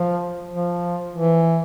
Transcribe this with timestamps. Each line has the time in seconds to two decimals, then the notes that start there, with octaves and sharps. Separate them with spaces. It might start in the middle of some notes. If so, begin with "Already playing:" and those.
Already playing: F3
0.53 F3
1.15 E3